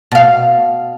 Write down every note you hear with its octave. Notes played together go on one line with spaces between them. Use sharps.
B2 F5